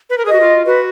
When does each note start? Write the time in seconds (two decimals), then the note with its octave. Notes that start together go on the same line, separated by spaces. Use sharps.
0.10 B4
0.18 A#4
0.25 G#4
0.28 F#4 D#5
0.41 F4
0.66 F#4 B4